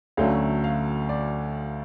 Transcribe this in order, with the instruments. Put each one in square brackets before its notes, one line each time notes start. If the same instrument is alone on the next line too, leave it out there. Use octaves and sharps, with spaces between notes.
[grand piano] D2 D3 F#3 A3 C#4 F5
F5
D5